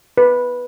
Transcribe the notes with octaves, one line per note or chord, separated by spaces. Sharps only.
B4